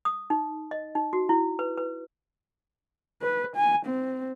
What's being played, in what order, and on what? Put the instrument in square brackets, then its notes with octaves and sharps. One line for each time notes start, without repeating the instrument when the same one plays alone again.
[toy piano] D#6
D#4
D#5
D#4
F#4
E4
B4
B4
[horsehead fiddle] B4
G#5
C4